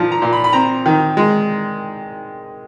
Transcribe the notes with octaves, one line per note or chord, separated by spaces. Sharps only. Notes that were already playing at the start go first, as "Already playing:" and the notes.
Already playing: A#2 F3 A5
A#5
A#2
B5
B5
C4 A#5
D#3
G#3